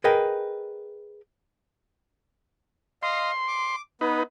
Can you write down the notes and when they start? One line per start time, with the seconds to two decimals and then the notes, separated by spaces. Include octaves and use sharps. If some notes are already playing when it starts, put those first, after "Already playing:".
0.04 G#4 A#4 B4 D#5 G5
3.03 D#5 F5 C6
3.48 D6
4.01 B3 D#4 B4